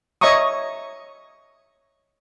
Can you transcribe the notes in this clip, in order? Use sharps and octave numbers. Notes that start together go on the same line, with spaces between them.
C#5 D#5 E5 A#5 C#6 D#6